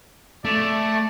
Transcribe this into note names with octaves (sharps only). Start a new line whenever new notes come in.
A3 D5